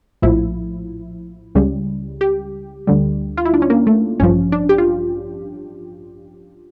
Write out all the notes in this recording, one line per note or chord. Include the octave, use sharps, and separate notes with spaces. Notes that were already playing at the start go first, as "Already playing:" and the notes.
A#1 A2 F3 E4
C#2 C#3 G3
G4
D2 D3 G3
F4
E4
D4
C#4
A#3
A3
A1 G2 F3 C#4
D4
G4
F4